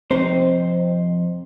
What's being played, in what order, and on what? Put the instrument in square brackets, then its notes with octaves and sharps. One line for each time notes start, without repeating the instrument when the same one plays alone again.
[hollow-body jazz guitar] F2 D#4 C5 [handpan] C4